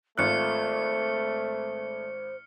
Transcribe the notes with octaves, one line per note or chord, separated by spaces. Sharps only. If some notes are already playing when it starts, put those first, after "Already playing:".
G#1 A3 F4 C5 F6 F#6 C#7